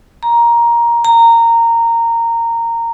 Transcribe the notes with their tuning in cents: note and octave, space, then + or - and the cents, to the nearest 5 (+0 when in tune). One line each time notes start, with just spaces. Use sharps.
A#5 +10
A#5 -15